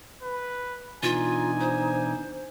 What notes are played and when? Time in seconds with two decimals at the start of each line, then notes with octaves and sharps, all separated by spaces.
0.23 B4
1.03 B2 E3 D4 D#4 F4 G#5
1.60 C5